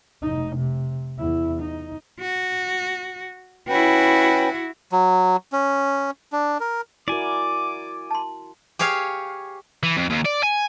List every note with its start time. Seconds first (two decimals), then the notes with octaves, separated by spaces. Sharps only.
0.22 F1 D#4
0.56 C3
1.18 E2 E4
1.61 D#4
2.21 F#4
3.68 C#4 E4 F#4 B4 G5
4.92 F#3
5.53 C#4
6.32 D4
6.60 A#4
7.08 E4 F#4 A#4 D5 G#5 D6
8.11 A5 C6
8.79 G4 G#4 C#5 F5
9.83 E3
9.97 F2
10.10 D#2
10.25 D5
10.43 G#5